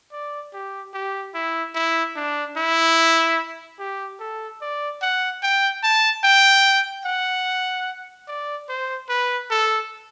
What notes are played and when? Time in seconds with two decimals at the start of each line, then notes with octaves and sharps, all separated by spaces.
0.12 D5
0.53 G4
0.94 G4
1.35 E4
1.75 E4
2.16 D4
2.57 E4
3.79 G4
4.20 A4
4.61 D5
5.02 F#5
5.43 G5
5.83 A5
6.24 G5
7.05 F#5
8.28 D5
8.69 C5
9.09 B4
9.51 A4